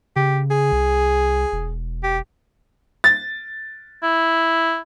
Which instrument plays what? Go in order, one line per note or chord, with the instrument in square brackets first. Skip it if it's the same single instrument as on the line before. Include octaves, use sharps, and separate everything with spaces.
[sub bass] C#3 [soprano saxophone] G4
[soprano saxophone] G#4
[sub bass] C2
E1
[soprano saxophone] G4
[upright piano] A6
[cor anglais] E4